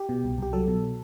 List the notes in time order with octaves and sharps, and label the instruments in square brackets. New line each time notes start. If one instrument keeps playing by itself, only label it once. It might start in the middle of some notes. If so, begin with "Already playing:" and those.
Already playing: [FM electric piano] G4
B2
C2
C2 G4
F#3 A4
B2